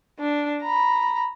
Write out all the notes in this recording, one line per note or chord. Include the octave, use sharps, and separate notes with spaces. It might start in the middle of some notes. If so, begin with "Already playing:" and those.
D4
A#5 B5